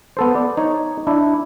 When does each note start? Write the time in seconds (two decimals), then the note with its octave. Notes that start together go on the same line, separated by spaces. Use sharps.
0.17 B3 A4 C5
0.35 D5
0.57 D#4 C#5
1.07 D4 E4